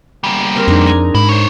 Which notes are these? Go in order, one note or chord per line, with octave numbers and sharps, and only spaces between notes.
G3 A#3
C4 A#4
F2 D4 D#4 G#4
G#5 A#5
G#2 E4
C5 C#5